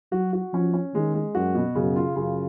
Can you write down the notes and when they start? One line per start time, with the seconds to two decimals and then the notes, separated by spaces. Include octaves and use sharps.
0.12 F#3 F#4
0.33 F#4
0.53 F3 C#4
0.74 C#4
0.94 D#3 G#3
1.15 G#3
1.35 F#2 F#4
1.55 B2
1.75 F#2 C#3
1.96 F4
2.16 F#2 C#3